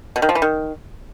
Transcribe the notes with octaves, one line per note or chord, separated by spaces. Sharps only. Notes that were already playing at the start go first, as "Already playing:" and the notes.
B2
D#3
F3
E3
D#3